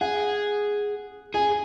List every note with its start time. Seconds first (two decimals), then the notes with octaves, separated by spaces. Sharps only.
0.01 G#4 F#5
1.34 G#4 G#5